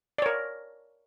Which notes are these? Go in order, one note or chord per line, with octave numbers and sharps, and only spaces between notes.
A#4 C#5 D5